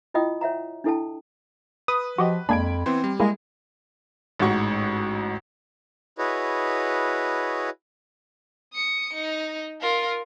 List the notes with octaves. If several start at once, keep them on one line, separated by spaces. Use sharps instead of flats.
E4 F4 D#5 G5 D#6
C#5 E5 F#5 A#5
D4 E4 A4 G5 A5
B4 D#6
F3 F#4 G4 D#5
F2 G#3 A#3 D4 B5 G#6 D7
E3 B3 C4 C5
G3
G#3 A#3 E4 G#4
A1 G#2 F#4 C#6
E4 F#4 G#4 B4 C#5 D#5
D#6 C#7
D#4
F4 A#4